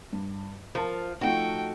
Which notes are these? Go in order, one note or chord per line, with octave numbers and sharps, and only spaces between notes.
G2
F3 A#4 A5
F3 A3 D#4 F#4 A4 G5